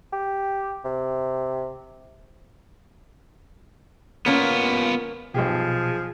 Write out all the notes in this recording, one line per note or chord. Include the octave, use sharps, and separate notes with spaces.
G4
C3
A#3 B3 C#4 F4
B1 B2 F3 G4 G#4